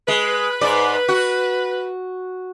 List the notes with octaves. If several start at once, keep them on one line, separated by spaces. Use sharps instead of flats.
G#3 B4
G#2 D5
F#4